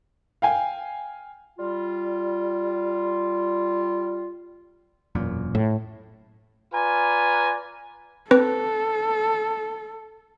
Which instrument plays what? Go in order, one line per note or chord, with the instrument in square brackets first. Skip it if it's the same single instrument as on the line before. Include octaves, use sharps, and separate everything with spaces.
[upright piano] F5 G5 G#5
[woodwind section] G3 F4
[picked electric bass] E1 F#2 A#2
[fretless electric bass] A2
[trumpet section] F4 B4 D5 G#5 A#5
[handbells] C4 B4 [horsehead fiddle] A4